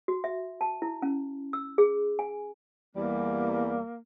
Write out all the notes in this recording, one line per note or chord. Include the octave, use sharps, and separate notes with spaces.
F#4
E5
A5
E4
C#4
E6
G#4
G#5
E2 G3 A#3